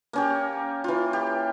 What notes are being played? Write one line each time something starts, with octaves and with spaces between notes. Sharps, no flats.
A#3 C#4 G4
E3 F4
G4